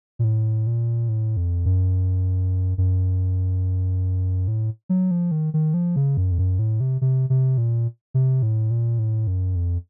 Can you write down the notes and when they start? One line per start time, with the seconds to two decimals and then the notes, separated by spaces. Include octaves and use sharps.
0.19 A#2
0.24 A2
0.67 A#2
1.09 A2
1.37 F2
1.66 F#2
2.78 F#2
4.48 A2
4.89 F#3
5.11 F3
5.31 D#3
5.54 D#3
5.74 F3
5.96 C#3
6.17 F#2
6.31 F2
6.38 F#2
6.59 A2
6.80 C3
7.01 C3
7.30 C3
7.58 A#2
8.14 C3
8.43 A2
8.71 A#2
8.99 A2
9.27 F#2
9.56 F2